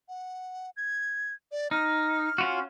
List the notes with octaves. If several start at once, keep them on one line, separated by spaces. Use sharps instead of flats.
F#5
G#6
D5
D#4 F6
C#4 F4 F#4